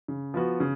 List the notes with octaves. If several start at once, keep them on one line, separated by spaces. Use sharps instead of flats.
C#3
F3 B3 F#4
C#3